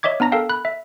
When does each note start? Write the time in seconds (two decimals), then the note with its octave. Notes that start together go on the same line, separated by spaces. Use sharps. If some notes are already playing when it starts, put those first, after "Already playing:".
0.03 C#5 D#5 E5 D6 G#6
0.20 B3 D4 A#5 A#6
0.32 A4 A#4 F5 G5
0.49 B5 F#6
0.65 E5